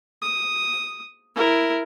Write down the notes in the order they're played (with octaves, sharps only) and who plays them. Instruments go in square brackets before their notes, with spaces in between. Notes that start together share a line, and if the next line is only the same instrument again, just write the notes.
[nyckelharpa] D#6
E4 A#4